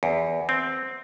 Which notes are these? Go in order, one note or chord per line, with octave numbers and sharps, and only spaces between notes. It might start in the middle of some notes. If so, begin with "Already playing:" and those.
E2
C4